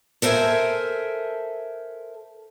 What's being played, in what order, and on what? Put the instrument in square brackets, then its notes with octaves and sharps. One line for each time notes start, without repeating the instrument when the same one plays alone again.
[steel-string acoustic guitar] A4 A#4 C5 E5 G#5 A5